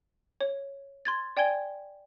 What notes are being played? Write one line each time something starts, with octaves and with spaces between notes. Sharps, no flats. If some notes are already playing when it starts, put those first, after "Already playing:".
C#5
C6 G#6 A6
D5 G5 G#5 G#6 G7